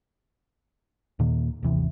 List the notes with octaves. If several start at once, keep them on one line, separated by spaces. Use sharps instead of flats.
D#2 A#2 D#3 A#3
D#1 G#1 C3 E3